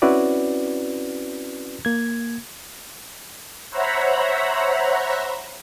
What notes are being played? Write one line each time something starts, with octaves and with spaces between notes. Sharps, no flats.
C4 C#4 E4 F#4 B4 D5
A#3 G#6
C5 C#5 E5 F#5 A#5 B5